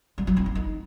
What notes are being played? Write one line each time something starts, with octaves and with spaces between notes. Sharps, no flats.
G3
F#3
C4
D4
D#4